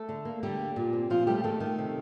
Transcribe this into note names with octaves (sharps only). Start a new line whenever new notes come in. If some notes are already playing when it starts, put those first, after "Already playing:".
Already playing: A3 A4
D3
A#3
D3 G3 G4
A#3
A#2
C4
A#2 F3 F4
G3 A3 G4
D#3 A3 A4
D#3
C3